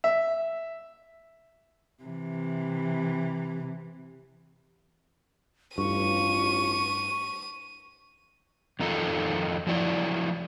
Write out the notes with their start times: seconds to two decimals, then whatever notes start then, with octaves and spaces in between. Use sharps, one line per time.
0.04 E5
2.03 C3 E3
5.78 A1 G2 F4 C#6 D#7
8.79 F2 D#3 D#4 F4 A4
9.67 F3 F#3 E4 D5